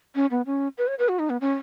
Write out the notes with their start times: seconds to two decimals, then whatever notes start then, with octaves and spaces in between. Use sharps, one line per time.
0.15 C#4
0.31 B3
0.46 C#4
0.78 B4
0.87 C#5
0.99 B4
1.08 F#4
1.19 D#4
1.30 B3
1.41 C#4